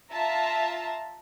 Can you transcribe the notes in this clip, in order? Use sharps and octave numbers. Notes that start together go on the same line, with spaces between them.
F4 E5 A5 A#5